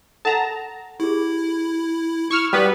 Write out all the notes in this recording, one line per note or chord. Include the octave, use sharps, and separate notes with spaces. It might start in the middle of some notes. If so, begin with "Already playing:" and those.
A4 F#5 A5 A#5
E4 G4 G#4
E4 C#6 E6 F6
G3 B3 F#4 B4